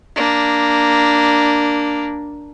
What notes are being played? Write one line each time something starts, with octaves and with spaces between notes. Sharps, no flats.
A#3 D4